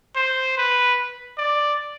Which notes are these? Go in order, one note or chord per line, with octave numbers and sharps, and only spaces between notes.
C5
B4
D5